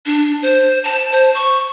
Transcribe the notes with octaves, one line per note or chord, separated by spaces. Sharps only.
D4
C5
A5
C5
C#6